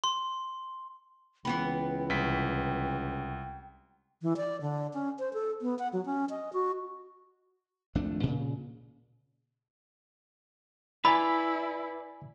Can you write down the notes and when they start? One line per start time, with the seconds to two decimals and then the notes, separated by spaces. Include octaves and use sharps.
0.04 C6
1.45 C#2 E3 B3 B4 G5
2.10 C2 B6
4.22 E3
4.37 D5
4.61 D3
4.94 C#4
5.19 C5
5.33 A4
5.62 B3
5.79 F#5
5.93 F#3
6.05 C#4
6.30 D#5
6.53 F#4
7.95 G#1 F2 A3 D4
8.23 A#2 C#3
11.05 E4 B4 D5 G#5 B5 E6